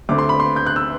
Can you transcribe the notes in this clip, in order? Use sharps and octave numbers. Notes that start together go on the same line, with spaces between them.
D2 D3 A3 C4 D6
C6
B5
C6
G6
F#6
E6